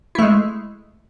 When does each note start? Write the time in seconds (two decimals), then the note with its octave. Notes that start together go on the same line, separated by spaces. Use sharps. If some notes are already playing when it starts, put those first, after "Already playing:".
0.15 E4
0.19 A3
0.22 G#3